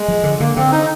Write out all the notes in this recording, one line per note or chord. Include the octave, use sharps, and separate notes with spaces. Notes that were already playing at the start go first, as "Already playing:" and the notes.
Already playing: G#3
F3
D3
D3 A#3
D3 C4
D#4